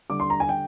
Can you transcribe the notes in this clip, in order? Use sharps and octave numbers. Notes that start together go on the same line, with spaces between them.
D3 G3 D6
C6
A#5
G#5
G5